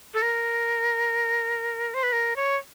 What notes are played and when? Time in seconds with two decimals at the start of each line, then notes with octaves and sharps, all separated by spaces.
0.14 A4
0.22 A#4
1.94 C5
2.03 B4
2.12 A#4
2.36 C#5